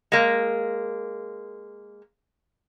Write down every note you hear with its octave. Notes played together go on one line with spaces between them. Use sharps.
G#3 A#3